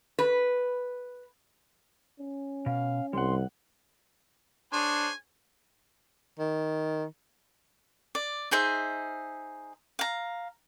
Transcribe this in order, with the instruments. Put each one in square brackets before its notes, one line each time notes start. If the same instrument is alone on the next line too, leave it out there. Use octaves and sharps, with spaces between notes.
[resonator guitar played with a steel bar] B4
[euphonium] C#4
[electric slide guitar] B2 [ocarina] F5
[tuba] C2 [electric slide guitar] G3 F#5 [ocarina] C6
[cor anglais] D4 [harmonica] G#4 C5 C#5 [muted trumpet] G#5
[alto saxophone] D#3
[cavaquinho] D5
D#4 G#4 C5 E5
F5 A#5